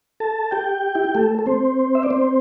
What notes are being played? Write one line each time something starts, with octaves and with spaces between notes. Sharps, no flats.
A4 A5
G4 G5
E4
G4
A3 A4
A4
C4 C5
E5
D5
C4 C5